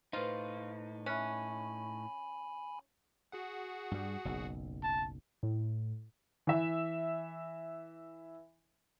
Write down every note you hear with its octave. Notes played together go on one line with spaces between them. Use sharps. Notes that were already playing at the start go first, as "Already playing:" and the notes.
A2 D#4 F4 B4 C5
C#4 E5 G#5 B5 F#6
F#4 G#4 F#5
G2 G3
F#1 B1
A5
A2
E3 E5